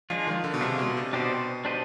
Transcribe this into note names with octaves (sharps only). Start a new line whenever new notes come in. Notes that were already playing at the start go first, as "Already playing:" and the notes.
F3 G#3 D4 F4
D#3
D3
B2
C3 G#3 D4 F4
B2
C3
B2 D4 G4 C5 D#5
D4 G4 C5 D#5